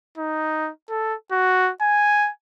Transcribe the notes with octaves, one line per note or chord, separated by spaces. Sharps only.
D#4
A4
F#4
G#5